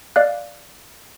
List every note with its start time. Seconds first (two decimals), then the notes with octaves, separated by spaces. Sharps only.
0.16 D5 D#5 F5 F#6